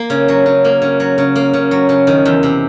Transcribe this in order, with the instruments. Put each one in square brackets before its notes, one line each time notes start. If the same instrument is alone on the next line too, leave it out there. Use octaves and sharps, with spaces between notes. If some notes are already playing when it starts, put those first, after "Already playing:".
Already playing: [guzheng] A#3
C#3
F#3
C#3
A#3
C#3
F#3
C#3
A#3
C#3
F#3
C#3
D#3
E2
C3